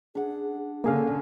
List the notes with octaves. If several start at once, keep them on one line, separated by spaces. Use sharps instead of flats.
D4 G#4 F#5
D3 A#3 C#4 G#4 A4 D5 F5